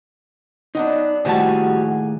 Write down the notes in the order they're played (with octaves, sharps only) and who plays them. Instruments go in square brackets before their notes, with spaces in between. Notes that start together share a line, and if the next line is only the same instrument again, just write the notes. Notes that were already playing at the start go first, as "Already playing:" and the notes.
[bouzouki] F#3 B3 D4 [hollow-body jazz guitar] D#4
[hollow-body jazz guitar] D#2 A2 A5 [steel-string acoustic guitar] F3 G3 F#4 [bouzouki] G#4